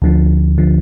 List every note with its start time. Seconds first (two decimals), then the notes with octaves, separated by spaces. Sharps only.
0.02 D2 D3 F3
0.58 D3 F3